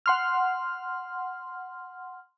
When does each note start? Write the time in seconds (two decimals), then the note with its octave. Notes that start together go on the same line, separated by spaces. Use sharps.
0.06 F#5 C6 F6